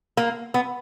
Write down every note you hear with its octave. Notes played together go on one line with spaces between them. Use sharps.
A#3
B3